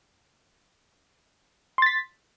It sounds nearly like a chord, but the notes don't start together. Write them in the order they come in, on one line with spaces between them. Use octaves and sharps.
C6 A6 B6